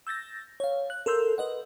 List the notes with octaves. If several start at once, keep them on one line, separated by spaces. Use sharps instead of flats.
E6 G6 A6 A#6
C#5 F5
F#6
A4 A#4 C6 E6 G6
B4 D#5 F#5